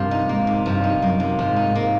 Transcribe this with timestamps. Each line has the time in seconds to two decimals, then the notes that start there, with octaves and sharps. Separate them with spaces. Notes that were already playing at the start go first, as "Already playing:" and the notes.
Already playing: G2 C3 F3 A#3
0.11 D#4
0.29 G#2 A#3
0.47 C3
0.66 G2 F3
0.84 D#4
1.02 F#2 A#3
1.20 C3
1.39 G#2 F3
1.56 D#4
1.75 A#3